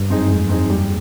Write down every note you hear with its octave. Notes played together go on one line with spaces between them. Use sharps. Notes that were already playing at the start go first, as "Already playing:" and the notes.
Already playing: G2
F#2 C4 D#4 G#4
F2 G#3
C4 D#4 G#4
G3